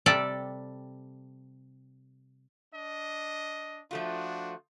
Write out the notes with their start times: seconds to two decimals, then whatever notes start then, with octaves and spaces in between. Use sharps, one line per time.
0.06 C3 G3 A4 D5
2.74 D4 D#5
3.91 F3 A3 D4 F4 F#4